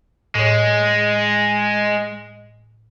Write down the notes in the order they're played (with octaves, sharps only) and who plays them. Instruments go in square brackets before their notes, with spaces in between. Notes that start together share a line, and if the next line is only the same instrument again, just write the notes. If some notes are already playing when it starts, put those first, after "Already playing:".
[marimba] A2 C#5 [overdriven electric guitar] G#3